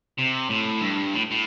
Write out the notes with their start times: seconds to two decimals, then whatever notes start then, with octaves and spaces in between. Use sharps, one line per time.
0.19 C3
0.50 A2
0.82 G2
1.14 A2
1.31 A2